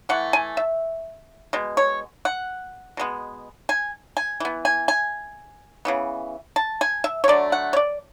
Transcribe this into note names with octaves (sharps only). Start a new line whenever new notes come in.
E3 A3 F#5
G#5
E5
B2 G#3
C#5
F#5
B2 G#3 B3
G#5
G#5
E3 B3
G#5
G#5
C#3 E3 B3
A5
G#5
E5
C#5
D3 F#3 A3 D5
F#5
C#5
D5